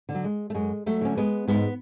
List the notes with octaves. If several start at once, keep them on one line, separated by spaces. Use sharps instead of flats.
D3
F#3
G#3
A3
F#2 G#3
F#3 A3
D3 C#4
G#3 B3
G#2 G#3 B3